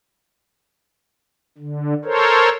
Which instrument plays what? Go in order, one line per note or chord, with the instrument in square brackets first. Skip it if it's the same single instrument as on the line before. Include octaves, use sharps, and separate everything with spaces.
[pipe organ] D3
A4 A#4 C5 C#5